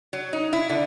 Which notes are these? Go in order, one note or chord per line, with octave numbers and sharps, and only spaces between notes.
F#3
D#4
E4
D3